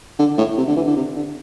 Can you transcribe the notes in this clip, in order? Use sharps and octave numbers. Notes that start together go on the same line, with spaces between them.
D3
A2
C3
D3
E3
D3
C3
D3